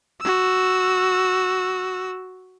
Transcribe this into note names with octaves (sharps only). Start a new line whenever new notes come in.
F#4 E6